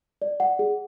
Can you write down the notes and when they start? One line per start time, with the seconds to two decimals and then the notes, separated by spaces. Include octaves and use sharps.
0.22 D5
0.40 F#5
0.59 G#4